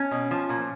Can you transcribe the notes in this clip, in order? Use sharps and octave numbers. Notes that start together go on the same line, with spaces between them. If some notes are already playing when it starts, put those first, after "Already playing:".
Already playing: C#4
B2
F3
A#2